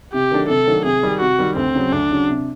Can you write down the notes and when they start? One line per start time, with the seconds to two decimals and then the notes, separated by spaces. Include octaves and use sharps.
0.13 C3 G4
0.31 D#3 F#3 A3 D4
0.49 C3 A4
0.67 D#3 F#3 A3 D4
0.85 C3 G#4
1.03 D#3 G3
1.20 C3 F#4
1.38 D#3 G3
1.56 D2 C4
1.75 C#3 F#3
1.92 D2 D4
2.11 C#3 F#3
2.29 C3